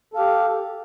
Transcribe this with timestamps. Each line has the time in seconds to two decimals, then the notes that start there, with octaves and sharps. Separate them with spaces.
0.13 A4
0.16 F5
0.18 G4